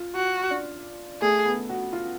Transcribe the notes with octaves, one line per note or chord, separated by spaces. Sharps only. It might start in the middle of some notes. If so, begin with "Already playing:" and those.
Already playing: F4
F#4
D4
A3 G#4
B3
F#4
F4